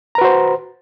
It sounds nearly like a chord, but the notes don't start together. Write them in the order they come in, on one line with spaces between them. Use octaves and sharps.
A#5 B4 F#4 C5